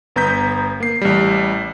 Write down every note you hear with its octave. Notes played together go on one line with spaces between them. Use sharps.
G1 B3 A#5 G6 B6
A#3 C7
A1 G3